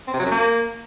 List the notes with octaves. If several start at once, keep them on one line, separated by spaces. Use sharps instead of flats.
C4
C3
F#3
F#2
A#3